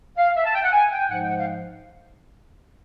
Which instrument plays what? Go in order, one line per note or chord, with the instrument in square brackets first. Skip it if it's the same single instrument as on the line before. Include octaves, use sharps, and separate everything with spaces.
[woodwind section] F5
E5
A5
G5
F#5
G#5
G5
G#2 F3 G#3 F#5
G5
F#5
F5